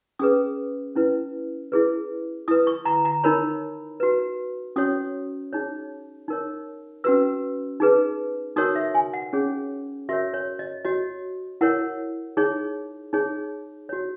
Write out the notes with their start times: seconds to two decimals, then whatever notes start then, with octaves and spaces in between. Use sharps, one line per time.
0.19 C#4 G#4 B4 D#6
0.96 C#4 E4 B4
1.72 E4 G#4 B4
2.48 E4 B4 D#6
2.67 C#6
2.85 A#5
3.05 A#5
3.24 D#4 A#4 C#5 B5
4.00 F#4 B4
4.76 C#4 F#4 C#5 D#6
5.53 D#4 G#4 C#5
6.28 D#4 A#4 C#5
7.04 C#4 F#4 B4 E6
7.80 D#4 G#4 B4
8.56 D#4 F#4 A#4 C#5 D#6
8.76 E5
8.95 G#5
9.13 F#5
9.33 C#4 G#4 C#5
10.09 F#4 A#4 C#5 E5
10.34 C#5
10.59 D#5
10.85 F#4 C#5 D#5
11.61 E4 A#4 C#5 F#5
12.37 D#4 G#4 C#5
13.13 D#4 G#4 C#5
13.89 F#4 C#5